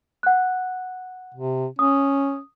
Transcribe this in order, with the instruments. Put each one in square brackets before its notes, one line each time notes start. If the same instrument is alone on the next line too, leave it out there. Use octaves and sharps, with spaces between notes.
[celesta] F#5 F#6
[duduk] C3
[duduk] C#4 [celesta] D#6